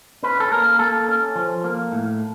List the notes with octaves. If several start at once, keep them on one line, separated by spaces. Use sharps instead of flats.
C#4 B4
A4
A#3 A#4
A#3 A4
C#4
F3
A#3
A2